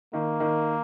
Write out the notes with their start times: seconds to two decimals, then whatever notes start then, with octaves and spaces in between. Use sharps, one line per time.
0.13 D#3 A#3
0.40 D#3